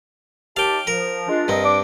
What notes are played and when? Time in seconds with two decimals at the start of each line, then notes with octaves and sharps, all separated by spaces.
0.57 D#2 G4 F5 G5 A5
0.87 F3 A#4
1.28 G#3 D4 F4
1.48 G2 C4 A#4 D#5
1.64 D4 D6